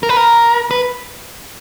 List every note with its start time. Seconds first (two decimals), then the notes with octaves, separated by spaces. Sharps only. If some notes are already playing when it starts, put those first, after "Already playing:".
0.03 A#4
0.09 B4
0.17 A#4
0.71 B4